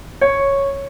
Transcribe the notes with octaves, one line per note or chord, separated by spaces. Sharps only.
C#5